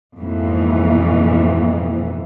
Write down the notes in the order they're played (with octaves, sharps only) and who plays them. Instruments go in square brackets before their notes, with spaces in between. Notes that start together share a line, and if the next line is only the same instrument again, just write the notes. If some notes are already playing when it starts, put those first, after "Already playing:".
[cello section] F2 G#2 B2 E3 A#3